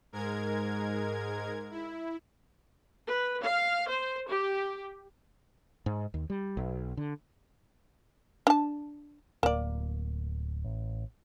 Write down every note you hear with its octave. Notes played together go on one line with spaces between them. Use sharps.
G#2 G#3 A#4 G#6
E4
B4
F5
C5
G4
G#2
D#2
G3
B1
D3
D4 A5
D1 A#3 D5
A1